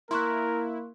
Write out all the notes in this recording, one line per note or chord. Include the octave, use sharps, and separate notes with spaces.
A#3 E4 A#4 C6 C#6 F#6